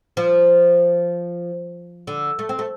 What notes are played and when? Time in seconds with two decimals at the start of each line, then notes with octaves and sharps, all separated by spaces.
0.17 F3
2.07 D3
2.39 A3
2.49 C4
2.59 A3